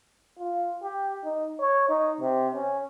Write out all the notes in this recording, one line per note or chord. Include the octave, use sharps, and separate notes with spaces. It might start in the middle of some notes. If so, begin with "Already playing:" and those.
F4
G4
D#4
C#5
D#4
C3
C#4